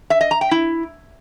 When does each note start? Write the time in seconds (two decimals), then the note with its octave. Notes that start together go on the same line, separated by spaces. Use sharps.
0.10 E5
0.21 D#5
0.31 A#5
0.41 G5
0.51 E4